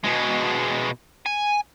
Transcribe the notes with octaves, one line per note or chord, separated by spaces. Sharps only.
B2 G#3
G#5